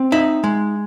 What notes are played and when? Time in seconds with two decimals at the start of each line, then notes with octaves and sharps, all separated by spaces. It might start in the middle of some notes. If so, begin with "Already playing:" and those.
Already playing: C4
0.12 D#4 E5
0.44 G#3